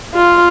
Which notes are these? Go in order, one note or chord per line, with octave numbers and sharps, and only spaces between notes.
F4